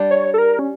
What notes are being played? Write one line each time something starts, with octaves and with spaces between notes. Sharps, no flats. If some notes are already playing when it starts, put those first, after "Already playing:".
Already playing: G3 D4 G4 D5
C#5
A4
A#4
C#4